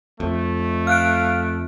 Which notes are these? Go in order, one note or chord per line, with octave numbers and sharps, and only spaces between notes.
F2 A3
F5 F6 F#6 D7